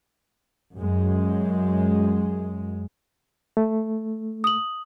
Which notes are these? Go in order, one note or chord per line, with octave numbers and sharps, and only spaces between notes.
F#2 G#3
A3
D#6 F#7